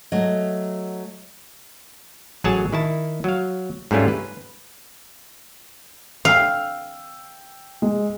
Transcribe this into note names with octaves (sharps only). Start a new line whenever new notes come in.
F#3 A3 D#5
A1 F#3 G#4 C#5 G#5 A5
D#3 E4 A5
F#3 F5
G#2 G3 A3 C#4 F4
B4
F5 G5 E6
G#3